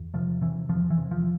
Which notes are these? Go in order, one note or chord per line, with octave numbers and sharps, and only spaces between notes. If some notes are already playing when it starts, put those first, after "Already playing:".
Already playing: E2
C3 F3
C3 E3
E2 F3
E3
C3
F3